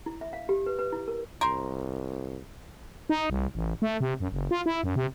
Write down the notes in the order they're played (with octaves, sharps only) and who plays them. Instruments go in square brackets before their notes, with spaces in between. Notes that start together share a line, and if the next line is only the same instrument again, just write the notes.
[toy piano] E4
E5
F5
G4
B4
B4
E4
A#4
[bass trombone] C2 [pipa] A#4 C5
[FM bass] D#4
C2
A1
A3
C3
F#2
F#1
F4
E4
F#2
C3